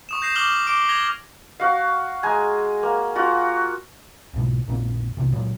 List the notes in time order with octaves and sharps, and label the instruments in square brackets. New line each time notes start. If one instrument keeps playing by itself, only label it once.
[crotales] C#6 D#6 E7
G6 A#6 C7 E7
C#6 D6 F6 F#7 G7
D6 D7
G#6 A#6 F7 G7
[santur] F#4 F5
G#3 G#4 G#5 A#5
A#3
F4 F#4
[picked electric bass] B1 G#2 B2
A#1 F#2 A#2 C4
B1 F#2 C3
C#2 A#2 F#3